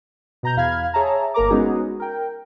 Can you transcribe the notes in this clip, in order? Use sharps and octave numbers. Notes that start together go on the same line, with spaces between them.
B2 A#5 G6
E2 F5 B5 F6 G#6
G#4 C#5 E5 A5 A#5
G1 A#3 A#4 A#5 D6
G#3 B3 C#4 D#4 F#4 G#4
A#4 G5